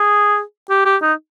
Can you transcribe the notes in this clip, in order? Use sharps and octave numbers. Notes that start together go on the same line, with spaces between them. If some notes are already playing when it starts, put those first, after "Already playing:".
Already playing: G#4
G4
G4
D#4